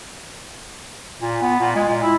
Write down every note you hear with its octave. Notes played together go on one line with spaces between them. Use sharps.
A#2
B3
A#2
G#3
A#2
E4